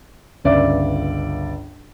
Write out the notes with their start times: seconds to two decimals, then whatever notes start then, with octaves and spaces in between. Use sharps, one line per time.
0.44 G1 C#2 D5 E5